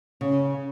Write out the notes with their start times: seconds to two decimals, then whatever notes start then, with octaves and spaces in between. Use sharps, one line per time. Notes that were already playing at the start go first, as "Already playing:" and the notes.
0.21 C#3